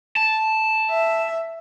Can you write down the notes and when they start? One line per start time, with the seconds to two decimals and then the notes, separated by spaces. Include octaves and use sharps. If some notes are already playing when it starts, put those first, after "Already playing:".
0.16 A5
0.90 E5